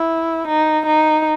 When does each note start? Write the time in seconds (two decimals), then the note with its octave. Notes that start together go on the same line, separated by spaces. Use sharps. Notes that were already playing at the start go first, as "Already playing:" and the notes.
Already playing: E4
0.47 D#4
0.86 D#4